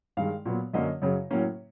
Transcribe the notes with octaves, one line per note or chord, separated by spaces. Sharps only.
G2 D#3 G#3 F5
A#2 F#3 B3
F#2 D3 F#3 A#3 C#4 D#5
F#2 C#3 F#3
A2 F#3 A#3 C#4